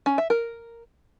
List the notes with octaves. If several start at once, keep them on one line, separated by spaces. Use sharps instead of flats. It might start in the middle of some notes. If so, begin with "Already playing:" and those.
C#4
E5
A#4